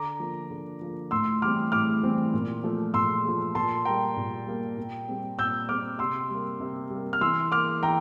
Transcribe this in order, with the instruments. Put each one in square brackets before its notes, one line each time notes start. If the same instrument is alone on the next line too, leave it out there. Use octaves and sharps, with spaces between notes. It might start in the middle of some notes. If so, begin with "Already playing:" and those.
Already playing: [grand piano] D3 A#5 D6
F3 A#3
D3
F3 A#3
A2 C6 E6
E3 G3 C4 D6 F6
A2 D6 F6
E3 G3 C4
A#2
F3 A3
A#2 C6 E6
F3 A3
A#2 A5 C6
G3 A#3 G5 A#5
A#2
G3 A#3
A#2
G3 C4
A#2 E6 G6
G3 C4 D6 F6
C3 C6 E6
G3 A#3
C3
G3
A#3
F6
E3 C6 E6
A#3 D6 F6
E3 G5 A#5